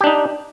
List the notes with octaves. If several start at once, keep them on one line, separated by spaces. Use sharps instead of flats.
D4 D#4 G4